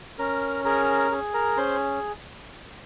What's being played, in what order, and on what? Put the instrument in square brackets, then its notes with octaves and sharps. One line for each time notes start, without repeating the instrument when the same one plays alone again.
[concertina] C#4 A#4 A#5
G#4 A#4 A#5
G#4
A#4 A#5
C#4 C5 C6